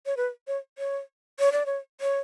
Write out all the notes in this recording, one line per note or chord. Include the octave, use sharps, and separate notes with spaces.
C#5
B4
C#5
C#5
C#5
D5
C#5
C#5